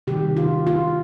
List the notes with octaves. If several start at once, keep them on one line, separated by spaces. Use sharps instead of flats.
C3 D#3 G3 G4
F4
F4